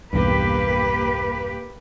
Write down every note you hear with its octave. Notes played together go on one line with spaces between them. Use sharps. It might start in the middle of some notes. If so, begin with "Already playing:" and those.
B1 E2 G2 A#3 G4 B4